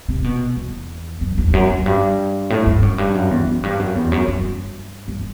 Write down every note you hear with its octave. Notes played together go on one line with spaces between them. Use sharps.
C3
B2
E2
F#2
E2
E2
F#2
F#2
G2
A2
G2
F#2
G2
F#2
E2
F#2
G2
F#2
E2
F#2
F#2
G2
G2